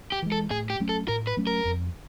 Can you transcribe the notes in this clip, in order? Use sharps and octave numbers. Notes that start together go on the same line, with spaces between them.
G4
E3 G#3
A4
A2 G#4
G4
F#3 A3 C#4
A4
A2 A#4
B4
F#3 A3 C#4
A#4
F2